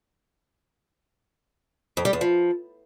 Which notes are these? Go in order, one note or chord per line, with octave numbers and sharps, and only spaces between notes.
F2
G3
E2
F3